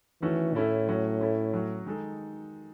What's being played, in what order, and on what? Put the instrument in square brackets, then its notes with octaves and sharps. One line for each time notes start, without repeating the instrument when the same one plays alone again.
[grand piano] D#3 A3 C#4 F#4 A4 [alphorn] E3
[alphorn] A2 [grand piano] A3 C#4 E4 A4
[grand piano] F#3 C#4 F#4
A3 C#4 E4 A4
F#3 C#4 F#4
D#3 G#3 D#4 A4